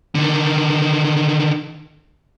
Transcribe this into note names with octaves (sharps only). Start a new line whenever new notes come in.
D3 D#3